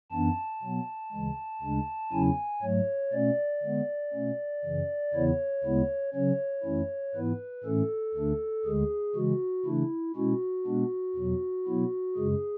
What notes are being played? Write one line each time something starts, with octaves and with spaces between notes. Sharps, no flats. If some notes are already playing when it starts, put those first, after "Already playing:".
F#2 E3 B3 D4 A5
B2 F#3 B3
D2 C#3 E3 G#3
D2 C#3 G#3 D4
E2 C#3 F#3 C#4 E4 G#5
G#2 F#3 A3 C#5
B2 A3 C#4 D5
D3 G#3 B3
B2 A3 C#4
F#2 C#3 E3
E2 C#3 E3 B3 E4 C#5
D2 C#3 G#3 B3 E4
C#3 F#3 C#4 C#5
F#2 E3 A3 C#4 E4
G#2 E3 B3 E4 B4
A2 E3 A3 C#4 A4
D2 D3 A3 D4
D2 D3 G#3 G#4
C#3 E3 G#3 F#4
C#3 E3 A3 D4 E4
B2 G#3 C#4 E4 F#4
B2 G#3 B3 D4
E2 B2 F#3
B2 F#3 B3 E4
F#2 C#3 G#3 G#4